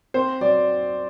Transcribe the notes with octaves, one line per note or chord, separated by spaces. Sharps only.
C4 C5
F#3 D5